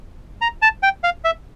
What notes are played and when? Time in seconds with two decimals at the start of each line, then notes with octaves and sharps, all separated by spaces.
0.42 A#5
0.62 A5
0.83 G5
1.04 F5
1.25 E5